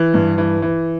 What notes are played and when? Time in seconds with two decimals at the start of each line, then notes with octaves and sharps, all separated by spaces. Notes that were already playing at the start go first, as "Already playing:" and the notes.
Already playing: E3
0.14 G2
0.38 E3
0.62 E3